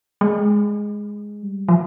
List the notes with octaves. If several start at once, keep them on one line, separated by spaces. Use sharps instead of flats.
G#3
G3
F3